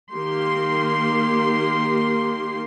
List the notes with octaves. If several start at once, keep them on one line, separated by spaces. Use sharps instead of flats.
D#3 A#3 G4 C6